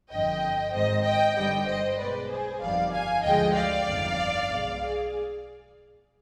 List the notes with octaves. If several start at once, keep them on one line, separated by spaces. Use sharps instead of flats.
G1 F2 D3 D#5 G5
G#1 G#2 D#3 C5 D#5
D#5 G5
G1 G2 D3 G3 D#5 G5
C5 D#5
B1 B2 G#3 B4 D5
G#4 C5
G1 F2 D#3 G3 D5 F5
F5 G#5
D2 D3 F3 G#3 D#5 G5
D5 F5
G1 F2 D#3
B1 B2 G#3
G#4